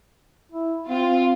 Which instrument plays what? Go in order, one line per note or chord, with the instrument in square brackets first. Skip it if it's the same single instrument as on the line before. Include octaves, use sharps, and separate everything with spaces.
[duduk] E4
[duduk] C4 [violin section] F4